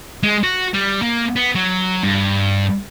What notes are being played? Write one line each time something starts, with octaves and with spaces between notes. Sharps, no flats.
G#3
F#4
G3
A#3
B3
F#3
G2